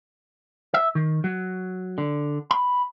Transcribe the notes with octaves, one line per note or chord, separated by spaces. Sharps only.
E5
D#3
F#3
D3
B5